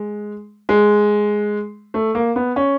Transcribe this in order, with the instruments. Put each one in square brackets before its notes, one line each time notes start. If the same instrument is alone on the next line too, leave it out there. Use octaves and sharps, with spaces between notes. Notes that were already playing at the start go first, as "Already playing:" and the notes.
Already playing: [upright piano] G#3
G#3
A3
A#3
B3
C#4